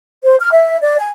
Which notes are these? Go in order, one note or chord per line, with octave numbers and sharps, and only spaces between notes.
C5
F6
E5
D5
G#5